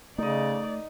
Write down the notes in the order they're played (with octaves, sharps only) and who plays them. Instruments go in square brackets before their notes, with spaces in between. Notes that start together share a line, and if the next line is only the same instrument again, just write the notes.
[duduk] C#3 [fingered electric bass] A3 [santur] D#4 D#5 [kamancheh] D5